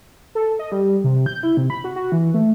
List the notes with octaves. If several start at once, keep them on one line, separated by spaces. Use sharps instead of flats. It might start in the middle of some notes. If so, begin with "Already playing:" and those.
A4
D#5
G3
C3
G6
E4
C3
B5
F#4
F#4
E3
A3